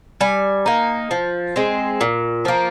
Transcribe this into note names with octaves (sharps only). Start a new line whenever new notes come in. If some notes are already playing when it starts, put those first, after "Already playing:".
G3 G#5
A#3 D#4
F3
G#3 C4
A#2
F3 A#3